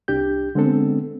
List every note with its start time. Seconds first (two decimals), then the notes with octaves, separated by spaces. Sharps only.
0.08 C2 D4 G4 G6
0.55 D3 G#3 B3 C4 D4 A4